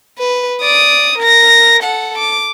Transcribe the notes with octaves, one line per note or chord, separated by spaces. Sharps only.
B4
D5 D#6
A#4 A#6
A4 F#5
D6